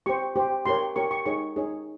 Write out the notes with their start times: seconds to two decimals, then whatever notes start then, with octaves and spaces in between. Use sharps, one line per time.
0.06 G4 C5 C#6
0.36 G4 C5
0.66 G4 A#4 C#5 C6
0.96 G4 A#4 C#5 C#6
1.11 C#6
1.26 D#4 G#4 C#5 C#6
1.56 D#4 G#4 C#5